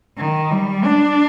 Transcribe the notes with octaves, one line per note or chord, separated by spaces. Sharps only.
D#3
G3
D4